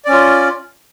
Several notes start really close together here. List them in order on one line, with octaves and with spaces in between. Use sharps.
D5 C#4 F4